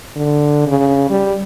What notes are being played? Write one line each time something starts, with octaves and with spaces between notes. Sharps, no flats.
D3
C#3
G3